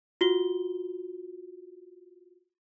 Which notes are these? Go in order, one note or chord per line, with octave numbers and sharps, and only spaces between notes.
F4 F#4 G7